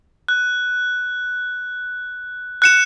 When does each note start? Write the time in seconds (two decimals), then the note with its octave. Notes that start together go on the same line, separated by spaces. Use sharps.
0.29 F#6
2.62 F#6 C#7 E7